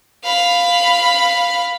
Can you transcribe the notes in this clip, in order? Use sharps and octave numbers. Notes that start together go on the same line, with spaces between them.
F5 B5